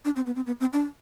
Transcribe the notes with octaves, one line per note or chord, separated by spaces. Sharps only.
D4
C4
B3
C4
B3
C4
D4